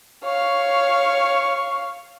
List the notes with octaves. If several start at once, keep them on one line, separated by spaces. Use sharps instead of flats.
C#5 F5 C#6